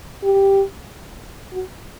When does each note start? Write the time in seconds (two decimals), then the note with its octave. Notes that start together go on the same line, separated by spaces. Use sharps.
0.24 G4
1.53 F#4